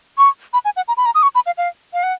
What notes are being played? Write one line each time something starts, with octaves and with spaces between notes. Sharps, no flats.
C#6
B5
G#5
F#5
A#5
B5
A#5
D#6
C#6
B5
F5
F5
F5
F#5